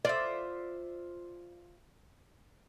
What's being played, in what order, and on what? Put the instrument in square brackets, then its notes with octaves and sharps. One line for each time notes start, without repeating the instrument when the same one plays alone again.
[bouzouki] F4 C5 E5 [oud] D5